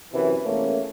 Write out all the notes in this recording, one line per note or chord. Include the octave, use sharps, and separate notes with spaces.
F#2 C3 E3
E2 A3 A#3 C#4